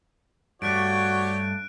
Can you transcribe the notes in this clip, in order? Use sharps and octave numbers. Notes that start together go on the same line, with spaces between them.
G2 A3 F#4 G4 C#5 D5 F#6 D7